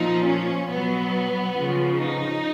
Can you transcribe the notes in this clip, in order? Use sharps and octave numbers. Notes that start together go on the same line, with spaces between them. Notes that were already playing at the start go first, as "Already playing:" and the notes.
Already playing: A#2 F3 D#4
C#4
B2 F#3 B3
C#3 F3
D#4